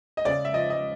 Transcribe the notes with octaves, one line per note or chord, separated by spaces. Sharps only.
D#5
C#3 D5
E5
F3 D#5
D#5